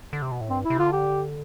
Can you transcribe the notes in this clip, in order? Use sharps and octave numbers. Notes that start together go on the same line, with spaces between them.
D3
C3
B2
A2
G2 C4
E4
C3
D3 F4
G4